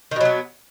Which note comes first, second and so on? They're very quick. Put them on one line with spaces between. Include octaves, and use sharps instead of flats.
D#3 B2 F#3 B3